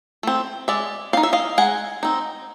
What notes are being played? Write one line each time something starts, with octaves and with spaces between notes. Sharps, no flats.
A3 C4
G#3 D5 E5
C4 D#4 F5
E5
D#5 F5
G#3 F#5 G#5
C4 D#4